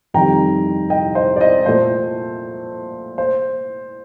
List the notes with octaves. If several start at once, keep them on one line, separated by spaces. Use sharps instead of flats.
F2 D#3 G3 G5 A#5
D#5 G5
C5 D#5
D5
C5 D#5
A#2 A3 C5
C5